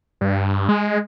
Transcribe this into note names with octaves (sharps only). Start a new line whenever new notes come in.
G2
G#3